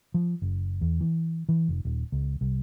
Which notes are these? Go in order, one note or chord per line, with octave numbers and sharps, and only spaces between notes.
F3
F#1
E2
E3
E3
F1
D#1
C#2
C2